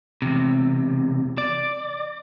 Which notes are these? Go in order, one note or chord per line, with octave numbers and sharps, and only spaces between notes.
E2 C3
D5